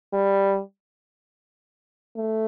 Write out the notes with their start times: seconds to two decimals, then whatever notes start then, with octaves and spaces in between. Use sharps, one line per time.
0.13 G3
2.16 A3